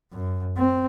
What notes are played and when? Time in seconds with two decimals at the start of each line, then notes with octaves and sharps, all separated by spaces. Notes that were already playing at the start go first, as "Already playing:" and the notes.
0.12 F#2
0.57 C4